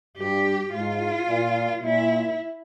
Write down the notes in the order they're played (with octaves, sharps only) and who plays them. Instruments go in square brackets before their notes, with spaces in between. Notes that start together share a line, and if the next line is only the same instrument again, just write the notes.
[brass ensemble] G2 [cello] G4
[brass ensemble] G#2 [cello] F4
[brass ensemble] A#2
[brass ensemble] A#2 [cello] E4